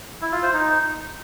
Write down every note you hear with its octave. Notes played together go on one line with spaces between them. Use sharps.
E4
F4
C5
D#4